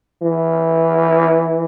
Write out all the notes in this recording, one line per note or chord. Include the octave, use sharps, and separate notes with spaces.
E3